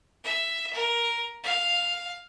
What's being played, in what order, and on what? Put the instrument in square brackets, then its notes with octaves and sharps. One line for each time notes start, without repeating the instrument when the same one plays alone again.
[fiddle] E5
A#4
F5